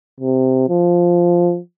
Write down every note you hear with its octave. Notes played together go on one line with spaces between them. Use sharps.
C3
F3